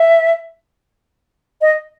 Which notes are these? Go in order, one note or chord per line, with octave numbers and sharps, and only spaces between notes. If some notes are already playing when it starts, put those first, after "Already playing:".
Already playing: E5
D#5